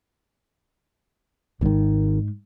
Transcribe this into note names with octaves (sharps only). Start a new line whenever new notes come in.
G#1 G#2 D#3 G#3